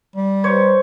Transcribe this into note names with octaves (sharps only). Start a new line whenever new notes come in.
G3
C5 C#5